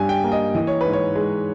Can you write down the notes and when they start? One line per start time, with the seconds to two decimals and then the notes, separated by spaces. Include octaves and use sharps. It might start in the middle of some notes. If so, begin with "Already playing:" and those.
Already playing: G2 G3 G#5
0.09 G5
0.24 A#3
0.32 D#5
0.55 E3 D#5
0.67 C#5
0.81 G#2 B4
0.93 C#5
1.15 G#3